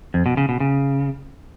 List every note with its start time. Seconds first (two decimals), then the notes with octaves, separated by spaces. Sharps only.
0.14 F2
0.26 B2
0.37 C#3
0.49 B2
0.60 C#3